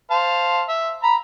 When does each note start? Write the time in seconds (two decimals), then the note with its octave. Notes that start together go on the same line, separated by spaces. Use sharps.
0.11 C5 F5 A5
0.68 E5
1.03 A#5 B5